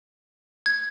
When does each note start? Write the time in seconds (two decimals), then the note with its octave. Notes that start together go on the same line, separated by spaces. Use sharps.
0.66 G#6